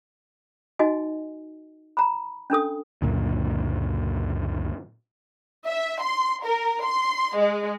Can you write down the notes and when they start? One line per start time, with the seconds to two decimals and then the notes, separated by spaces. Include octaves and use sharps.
0.79 D#4 F#4 D#5 G#5
1.97 A#5 B5
2.50 C#4 D4 A4 D#6
3.02 C#2 F#2 A#2 D3
5.67 E5
6.02 C6
6.44 A#4
6.84 C6
7.37 G#3